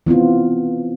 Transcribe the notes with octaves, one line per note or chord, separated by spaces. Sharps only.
E3 B3 C4 F4